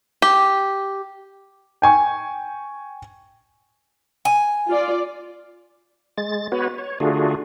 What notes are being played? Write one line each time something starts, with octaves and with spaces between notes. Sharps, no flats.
G4
G5 G#5 C#6
G#5
F4 D5
G#3 A6
B3 F#4 B4 C#5
C#5
D3 A3 D4 F4 F#4 G#4